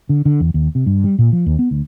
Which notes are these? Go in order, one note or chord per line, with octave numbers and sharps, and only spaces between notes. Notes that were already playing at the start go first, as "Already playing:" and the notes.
D3
D3
E2
D#2
C3
G2
G3
A#2
F3
D#2
B3
D2